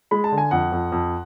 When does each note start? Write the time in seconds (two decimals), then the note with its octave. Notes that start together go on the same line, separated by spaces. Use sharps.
0.11 G#3 B5
0.24 A5
0.32 D3
0.38 G#5
0.51 F2 F#5
0.72 F2
0.92 F2